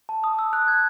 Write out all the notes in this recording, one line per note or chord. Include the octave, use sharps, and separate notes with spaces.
A5
D#6
E6
F#6
G#6